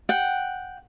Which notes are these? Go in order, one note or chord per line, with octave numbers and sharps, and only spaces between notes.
F#5 G5